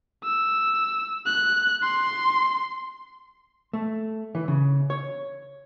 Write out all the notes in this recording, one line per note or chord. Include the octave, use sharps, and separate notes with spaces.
E6
F#6
C6
A3
E3
C#3
C#5